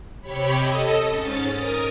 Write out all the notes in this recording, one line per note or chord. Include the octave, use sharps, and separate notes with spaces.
C3 G4 C#5 B5
A4 D#5
G#2 C#4 A6
A#4 D#6